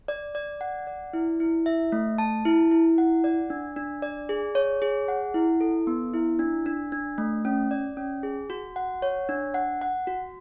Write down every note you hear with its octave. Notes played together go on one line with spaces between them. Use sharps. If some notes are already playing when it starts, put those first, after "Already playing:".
D5
D5
F#5
D5
E4
E4
E5
A3
A5
E4
E4
F#5
D5
D4
D4
D5
G#4
C#5
G#4
F#5
E4
A4
B3
E4
D4
D4
D4
A3
C#4
D5
C#4
G#4
F#4
F#5
C#5
D4
F#5
F#5
F#4